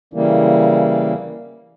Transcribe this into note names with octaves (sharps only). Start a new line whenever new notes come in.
C#3 E3 G3 A#3